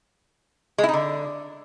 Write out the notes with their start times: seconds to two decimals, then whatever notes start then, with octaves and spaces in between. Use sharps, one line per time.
0.78 G#3
0.83 E4
0.89 D#4
0.94 D3